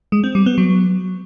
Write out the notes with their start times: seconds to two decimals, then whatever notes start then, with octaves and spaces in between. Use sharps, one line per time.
0.12 G#3
0.24 C4
0.35 G3
0.46 B3
0.58 F#3